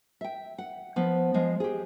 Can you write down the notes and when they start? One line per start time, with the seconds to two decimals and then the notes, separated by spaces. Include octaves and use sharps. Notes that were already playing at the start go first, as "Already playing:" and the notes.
0.21 E5 G5
0.58 F#5
0.96 F3 B3
1.34 F3 G#3
1.60 G4 G#4